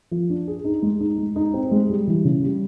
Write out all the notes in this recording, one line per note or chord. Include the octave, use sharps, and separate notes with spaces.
F3
D4
G#4
D#4
G#3
D#4
G#3
D#4
C4
G#3
G3
E3
C#3
G3